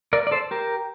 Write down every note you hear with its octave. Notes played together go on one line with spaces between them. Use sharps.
A#4 D5
D5
A4 C5
G4 A#4